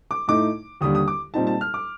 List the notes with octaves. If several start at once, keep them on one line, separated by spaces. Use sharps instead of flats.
D6
A2 A3 D#4 D6
D#2 D3 G3 D#6
D#6
D6
A#2 G3 C4 D#4 A5
A5
F6
D6